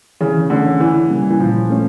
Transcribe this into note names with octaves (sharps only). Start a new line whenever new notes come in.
C#3 E3
D3 A3 C#4
C#2 E3
C#3 G3 A#3 C#4
E3
A#2 F3
A3 C#4